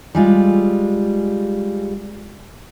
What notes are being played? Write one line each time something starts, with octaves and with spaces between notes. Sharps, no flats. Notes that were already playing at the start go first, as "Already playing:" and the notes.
G3 G#3 F4